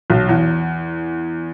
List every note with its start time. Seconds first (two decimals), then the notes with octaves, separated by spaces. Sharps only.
0.10 B1
0.29 E2